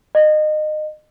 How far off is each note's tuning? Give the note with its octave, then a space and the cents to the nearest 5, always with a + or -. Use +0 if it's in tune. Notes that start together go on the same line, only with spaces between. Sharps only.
D#5 -25